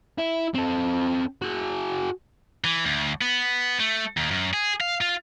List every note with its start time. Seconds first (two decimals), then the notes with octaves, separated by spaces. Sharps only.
0.18 E4
0.54 C4 A4
1.42 F#4 G#4
2.64 E3
2.85 D2
3.21 B3
3.80 A3
4.17 D#2
4.31 F#2
4.54 G#4
4.81 F5
5.01 F4